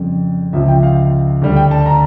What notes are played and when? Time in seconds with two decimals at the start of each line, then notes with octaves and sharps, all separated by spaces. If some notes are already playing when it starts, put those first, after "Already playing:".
Already playing: F2 C#3 G3
0.53 C#2 C#3 F3 E5
0.68 G5
0.83 F5
1.42 D2 D3 G3
1.56 G5
1.71 A5
1.86 A#5